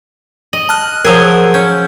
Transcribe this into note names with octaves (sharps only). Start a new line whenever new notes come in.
D#5 F#7
A5 F6 F#6
F3 F#3 G#4 A#4 E6
C#4 G6